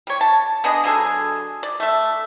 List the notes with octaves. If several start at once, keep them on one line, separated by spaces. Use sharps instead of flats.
G3 C#5
A5
B3 D4 G#4 D#5
D3 F#3 G#4 A4
D5
A3 E5